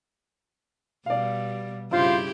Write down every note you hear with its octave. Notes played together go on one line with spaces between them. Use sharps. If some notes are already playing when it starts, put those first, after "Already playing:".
B2 G3 D5 F5
G2 C#3 E4 F4 G4 C5